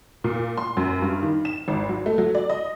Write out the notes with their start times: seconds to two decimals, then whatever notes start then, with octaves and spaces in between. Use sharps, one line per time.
0.24 A#2
0.58 C6
0.77 F#2
1.02 G2
1.23 D#3
1.45 E7
1.68 G#1
1.89 F#3
2.06 A3
2.18 F#3
2.35 D5
2.50 D#5